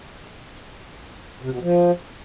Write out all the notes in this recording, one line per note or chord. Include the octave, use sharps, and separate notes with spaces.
C3
B2
F3